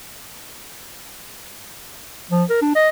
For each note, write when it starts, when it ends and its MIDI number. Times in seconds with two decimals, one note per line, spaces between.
2.31 2.44 53
2.50 2.62 70
2.62 2.70 62
2.75 2.89 75